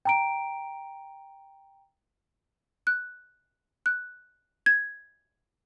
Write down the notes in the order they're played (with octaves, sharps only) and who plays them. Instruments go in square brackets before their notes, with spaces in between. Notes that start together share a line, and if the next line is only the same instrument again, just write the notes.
[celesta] G5 A#5 D7
[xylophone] F#6
F#6
G#6